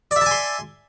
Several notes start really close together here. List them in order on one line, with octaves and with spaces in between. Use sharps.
D5 E5 A5 G#5 C6